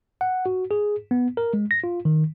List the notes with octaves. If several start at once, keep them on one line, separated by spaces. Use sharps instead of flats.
F#5
F#4
G#4
B3
A#4
G#3
A#6
F4
D#3